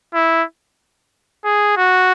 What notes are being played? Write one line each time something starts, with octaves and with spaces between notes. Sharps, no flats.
E4
G#4
F#4